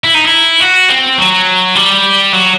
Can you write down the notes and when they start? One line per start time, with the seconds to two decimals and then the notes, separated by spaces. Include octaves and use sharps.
0.04 E4
0.15 D#4
0.25 E4
0.61 F#4
0.90 C4
1.18 F#3
1.75 G3
2.33 F#3